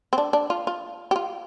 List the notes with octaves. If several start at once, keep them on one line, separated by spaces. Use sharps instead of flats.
C4
D4
D4
F4
F4
G4
F4